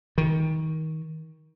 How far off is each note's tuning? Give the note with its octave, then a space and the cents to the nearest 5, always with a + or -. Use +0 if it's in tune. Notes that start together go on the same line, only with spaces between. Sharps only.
D#3 +25